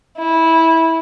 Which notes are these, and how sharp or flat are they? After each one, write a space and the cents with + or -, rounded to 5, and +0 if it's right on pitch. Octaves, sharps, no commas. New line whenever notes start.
E4 -15